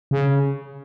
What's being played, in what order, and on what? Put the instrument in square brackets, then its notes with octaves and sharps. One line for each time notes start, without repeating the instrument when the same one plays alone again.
[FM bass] C#3